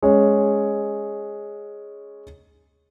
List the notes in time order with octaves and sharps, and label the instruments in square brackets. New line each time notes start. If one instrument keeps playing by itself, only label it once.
[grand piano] G#3 C#4 C#5